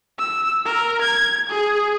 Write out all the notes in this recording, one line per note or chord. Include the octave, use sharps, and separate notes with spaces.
E6
A#4
G#6
G#4